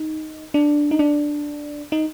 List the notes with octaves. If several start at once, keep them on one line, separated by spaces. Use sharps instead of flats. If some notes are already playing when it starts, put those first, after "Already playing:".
Already playing: D#4
D4
D#4
D4
D#4